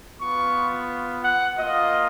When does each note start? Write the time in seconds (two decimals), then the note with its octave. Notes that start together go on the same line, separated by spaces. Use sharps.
0.19 B3 F4 C#6
1.23 F#5
1.57 A#3 F4 D#5